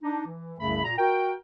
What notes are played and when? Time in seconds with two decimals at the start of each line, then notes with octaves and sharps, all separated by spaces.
0.03 D4 D#4
0.26 E3
0.60 C2 F#2 C#3 A3 B5
0.83 A#2 A#5
0.97 F#4 A#4 G5